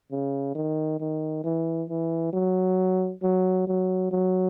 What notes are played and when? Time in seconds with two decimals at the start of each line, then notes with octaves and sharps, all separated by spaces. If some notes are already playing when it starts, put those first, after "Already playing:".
0.11 C#3
0.55 D#3
1.00 D#3
1.44 E3
1.89 E3
2.33 F#3
3.23 F#3
3.67 F#3
4.11 F#3